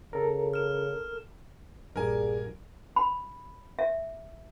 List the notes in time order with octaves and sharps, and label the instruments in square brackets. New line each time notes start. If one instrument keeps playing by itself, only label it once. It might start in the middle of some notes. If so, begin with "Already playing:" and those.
[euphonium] C#3 [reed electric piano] A4 A#4
[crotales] F6 E7
[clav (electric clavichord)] A#1 G2 [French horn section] G#4 D5 [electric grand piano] A#4 G#5
[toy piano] B5
E5